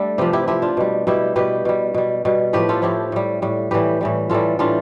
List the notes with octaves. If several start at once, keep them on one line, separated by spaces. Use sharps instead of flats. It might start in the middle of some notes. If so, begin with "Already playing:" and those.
Already playing: G3 A3 D4 A4
C3 F3 G4 B4
E4 G4
C3 F3 E4 G4
D4 F4
B2 G3
B2 G3 E4 G4
B2 G3 G4 B4
B2 G3
B2 G3
B2 G3
A2 F3 G4 B4
F4 A4
A2 F3 E4 G4
A2 G3
A2 G3
A2 E3 G3 G4 B4
A2 E3 G3
A2 E3 G3 F4 A4
A2 E3 G3 D4 F4